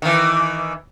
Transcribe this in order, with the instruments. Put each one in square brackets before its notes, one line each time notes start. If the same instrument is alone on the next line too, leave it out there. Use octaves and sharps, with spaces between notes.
[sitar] D#3 E3